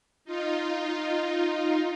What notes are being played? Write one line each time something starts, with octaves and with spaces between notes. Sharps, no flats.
D#4 F4